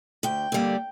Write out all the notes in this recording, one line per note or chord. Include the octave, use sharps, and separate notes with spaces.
D2 G5
D3 G3 A#3